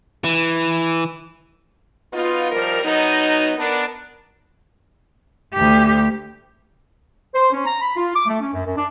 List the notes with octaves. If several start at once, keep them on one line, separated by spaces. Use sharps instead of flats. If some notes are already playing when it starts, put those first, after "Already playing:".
E3
B2 B3 D#4 F4
D#3 F3 G3 A#4
B2 F#3 B3 D#4
B3 D4 A#4
D2 G4
C5
C#4
A#5
B5
F4
D6
A3
C#4
F#2
F#2
D4